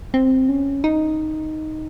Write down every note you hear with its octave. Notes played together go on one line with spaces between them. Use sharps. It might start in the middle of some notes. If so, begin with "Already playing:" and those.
C4
C#4
D#4